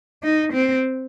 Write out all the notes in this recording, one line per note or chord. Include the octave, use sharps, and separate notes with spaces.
D#4
C4